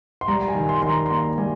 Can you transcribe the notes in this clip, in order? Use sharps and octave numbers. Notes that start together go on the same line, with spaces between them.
C6
G3 A#5
G#5
D#3
C6
D#3 C6
A#5
C6
A#3 A#5
G3 G#5